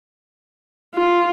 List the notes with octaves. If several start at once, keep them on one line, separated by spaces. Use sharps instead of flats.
F4